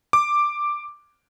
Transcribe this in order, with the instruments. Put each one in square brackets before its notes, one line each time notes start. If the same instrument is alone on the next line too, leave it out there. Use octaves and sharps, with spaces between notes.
[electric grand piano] D6